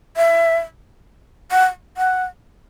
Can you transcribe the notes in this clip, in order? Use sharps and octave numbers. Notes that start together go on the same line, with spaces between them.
E5
F#5
F#5